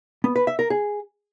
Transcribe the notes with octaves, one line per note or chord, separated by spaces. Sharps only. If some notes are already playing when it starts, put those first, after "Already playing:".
B3
B4
E5
A#4
G#4